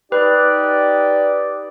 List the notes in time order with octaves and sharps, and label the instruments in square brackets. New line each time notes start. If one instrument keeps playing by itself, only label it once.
[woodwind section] D#4 G4 D5 [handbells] B4 F#6